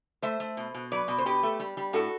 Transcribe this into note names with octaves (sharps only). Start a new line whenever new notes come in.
A3 C5 E5
A3
B2
B2
F#3 B4 D5
B2
C5
B2 G4 B4
A3
G3
G3
A2 F#4 A4